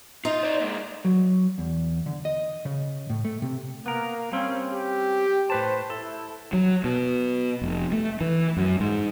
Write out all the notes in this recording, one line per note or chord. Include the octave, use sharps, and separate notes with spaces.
D#4 F4
C5 D5
A#2 G#3
F#3
E2
D3
D#5
C#3
A2
A3
C3
A#3 B3 A#4
G3 C4 C#4 F5
G4
A2 B4 C5 A5
E4 A4
F#3
B2
F1
A3
E3
F#2
G#2